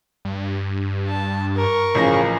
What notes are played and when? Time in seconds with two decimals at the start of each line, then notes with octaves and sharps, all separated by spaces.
0.25 G2
1.08 A5
1.56 A#4 C#6
1.95 A1 C#3 F3 A#6